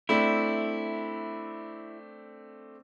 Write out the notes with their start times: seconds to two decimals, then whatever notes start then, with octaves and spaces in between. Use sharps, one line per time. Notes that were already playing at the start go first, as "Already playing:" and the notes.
0.09 A3 C4 D4 E4